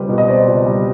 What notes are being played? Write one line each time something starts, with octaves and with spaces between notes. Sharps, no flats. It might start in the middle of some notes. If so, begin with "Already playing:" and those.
Already playing: C#2 G3 C4 B4
B2
D#5
C4 C5 D5
C#2
G3